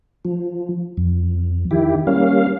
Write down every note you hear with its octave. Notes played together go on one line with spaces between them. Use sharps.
F3
F2
D#3 E4 G4
G3 A#3 C#4 F5